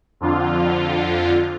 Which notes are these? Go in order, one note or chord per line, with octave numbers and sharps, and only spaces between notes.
F2 D3 F4